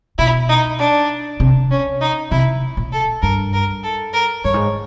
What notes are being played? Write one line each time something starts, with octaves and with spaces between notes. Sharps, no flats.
B2 E4
D#4
D4
C3
C#4
D#4
C3 E4
A#2
A4
G2 A#4
A#4
A4
A#4
G2 C#5
G#2